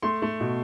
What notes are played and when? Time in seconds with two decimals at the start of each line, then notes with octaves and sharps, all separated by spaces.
0.02 A3 C6
0.22 A3
0.41 B2